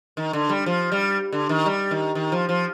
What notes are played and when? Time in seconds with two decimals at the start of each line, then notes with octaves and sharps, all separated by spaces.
0.17 D#3
0.33 D3
0.49 G3
0.66 F3
0.92 G3
1.32 D3
1.49 D#3
1.66 G3
1.91 D#3
2.15 D#3
2.32 F3
2.49 F3